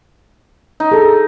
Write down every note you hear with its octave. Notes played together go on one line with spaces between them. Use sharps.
D#4
G#4 A4